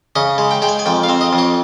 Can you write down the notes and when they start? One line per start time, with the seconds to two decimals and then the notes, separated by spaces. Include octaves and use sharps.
0.16 C#3 D#5
0.38 G#3
0.51 G5
0.62 G#3 G5
0.68 G#5
0.79 G#5
0.86 F2 G5
1.03 F5
1.09 C4
1.21 D#5
1.33 F2
1.38 C#5